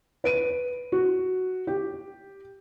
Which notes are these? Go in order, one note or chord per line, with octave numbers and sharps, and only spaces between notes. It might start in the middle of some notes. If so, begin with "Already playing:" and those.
B4 D7 D#7
F#4
G4